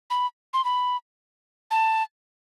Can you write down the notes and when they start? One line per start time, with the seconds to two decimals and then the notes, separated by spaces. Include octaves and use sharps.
0.10 B5
0.54 C6
0.65 B5
1.71 A5